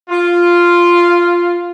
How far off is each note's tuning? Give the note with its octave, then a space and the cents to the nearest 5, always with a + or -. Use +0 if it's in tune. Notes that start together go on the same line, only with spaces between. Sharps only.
F4 -5